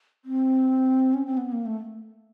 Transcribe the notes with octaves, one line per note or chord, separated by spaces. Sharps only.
C4
C#4
C4
B3
A#3
A3